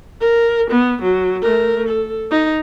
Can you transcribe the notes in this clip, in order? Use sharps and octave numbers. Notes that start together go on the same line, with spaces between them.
A#4
B3
F#3
A3 A#4
A4
D#4